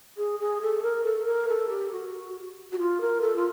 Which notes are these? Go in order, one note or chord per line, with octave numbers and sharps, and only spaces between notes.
G#4
G#4
A4
A#4
A4
A#4
A4
G4
F#4
F#4
F4
A#4
A4
F4